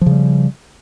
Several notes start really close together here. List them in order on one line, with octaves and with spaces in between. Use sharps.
F3 C#3 G3